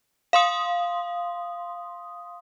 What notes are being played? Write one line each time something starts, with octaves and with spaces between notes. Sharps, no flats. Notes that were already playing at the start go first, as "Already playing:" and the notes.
F5 C6 D#6